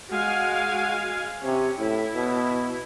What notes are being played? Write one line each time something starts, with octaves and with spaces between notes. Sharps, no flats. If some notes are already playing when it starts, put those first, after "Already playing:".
G#3 F#4 F5 G#5
C3 C#4
A2 E4
B2